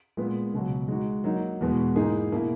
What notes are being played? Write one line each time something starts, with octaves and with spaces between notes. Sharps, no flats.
A#2 G#3 B3
C#2 B2 F#3
G#3 D#4 F#4
F#3 A#3 D#4
E2 B2 G#3 B3 F#4
G#2 E3 A#3 D#4 G#4
B2 A#3 E4